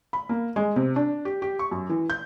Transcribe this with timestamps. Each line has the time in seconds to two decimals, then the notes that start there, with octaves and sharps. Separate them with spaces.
0.13 B5
0.29 A#3
0.56 G#3
0.76 C3
0.96 D4
1.25 G4
1.42 G4
1.59 C#6
1.71 F#2
1.89 E3
2.10 G6